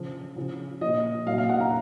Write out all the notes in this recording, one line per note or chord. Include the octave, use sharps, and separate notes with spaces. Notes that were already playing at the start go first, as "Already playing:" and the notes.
Already playing: C#3 F3
C#3 F3
A#2 F3 D#5
A#2 F#3 F5
F5
F#5
A#5